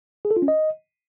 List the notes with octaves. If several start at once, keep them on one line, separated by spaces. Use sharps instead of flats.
G#4
A4
F4
C#4
D#5